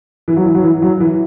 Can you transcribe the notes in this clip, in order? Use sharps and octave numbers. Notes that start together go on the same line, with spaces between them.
E3
F#3
E3
F#3
E3
F#3
E3